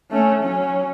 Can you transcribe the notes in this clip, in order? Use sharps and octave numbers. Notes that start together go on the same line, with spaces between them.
A3 C#4
F#3 C#4